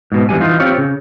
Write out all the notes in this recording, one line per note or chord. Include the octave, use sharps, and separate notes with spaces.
G#2 B2
E2 G2 A#2 G3 G#5
E3 D#4 F4
C4 F4 G4 C#5
C#3